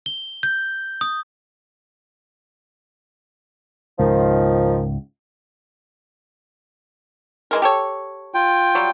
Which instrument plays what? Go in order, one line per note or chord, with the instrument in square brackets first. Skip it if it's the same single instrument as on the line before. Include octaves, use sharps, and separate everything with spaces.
[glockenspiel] G7
G6
D#6
[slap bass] C#2 G#2 [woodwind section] D#3 F3
[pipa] E3 G#3 A#4
G4 A4 C#5
[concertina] F4 G5
[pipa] F#3 G3